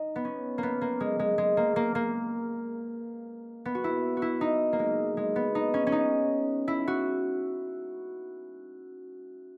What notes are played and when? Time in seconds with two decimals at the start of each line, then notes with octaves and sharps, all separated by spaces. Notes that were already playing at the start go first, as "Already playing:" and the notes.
Already playing: D#4
0.16 B3
0.25 C#4
0.58 A#3
0.63 B3
0.81 A#3
1.00 G#3
1.19 G#3
1.38 G#3
1.57 A#3
1.76 A#3
1.95 A#3
3.65 B3
3.75 F#4
3.84 E4
4.17 F#4
4.22 E4
4.41 D#4
4.73 A#3
4.79 G#3
5.17 G#3
5.36 B3
5.55 D#4
5.74 C#4
5.87 C#4
5.92 D#4
6.68 E4
6.88 F#4